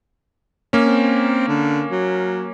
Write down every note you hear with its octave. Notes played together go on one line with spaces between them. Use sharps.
A#3 C#4
C4
D3
F#3